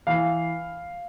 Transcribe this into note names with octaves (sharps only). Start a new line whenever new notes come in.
E3 F5